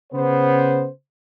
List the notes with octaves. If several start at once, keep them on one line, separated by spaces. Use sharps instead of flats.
C#3 B3 C5